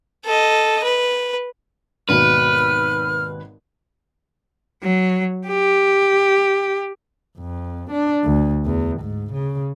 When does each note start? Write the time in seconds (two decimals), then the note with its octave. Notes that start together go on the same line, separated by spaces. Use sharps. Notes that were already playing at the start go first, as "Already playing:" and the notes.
0.25 A4 D#5
0.84 B4
2.09 G#1 D#2 B2 B4 F6
4.83 F#3
5.48 G4
7.39 F2
7.91 D4
8.24 D2
8.65 E2
9.01 G#2
9.33 C#3